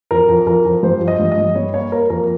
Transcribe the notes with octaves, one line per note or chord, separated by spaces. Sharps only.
F2 A#4
F2
F2 A#4
F2
G2 C5
F3
D#5
G2
D#5
G2
G3 C#5
A#3 C#5
A#3 A#4
F2 A#4